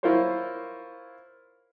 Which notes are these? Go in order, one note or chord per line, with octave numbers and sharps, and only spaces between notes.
E4 F4 A#4 C5 C#5